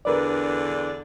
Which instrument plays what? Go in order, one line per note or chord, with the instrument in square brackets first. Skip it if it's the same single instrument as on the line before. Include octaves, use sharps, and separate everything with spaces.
[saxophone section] E2 D3 D4 [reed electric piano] A#4 B4 D5